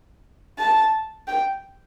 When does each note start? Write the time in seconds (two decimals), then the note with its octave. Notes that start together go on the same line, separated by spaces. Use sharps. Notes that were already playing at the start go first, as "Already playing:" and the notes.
0.58 A5
1.27 G5